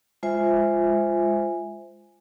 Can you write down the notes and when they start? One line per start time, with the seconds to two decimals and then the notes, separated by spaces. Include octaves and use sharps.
0.23 G#3 F4 C5 E5 G#5